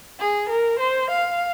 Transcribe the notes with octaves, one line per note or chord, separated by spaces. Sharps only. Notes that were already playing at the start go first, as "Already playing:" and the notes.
G#4
A#4
C5
F5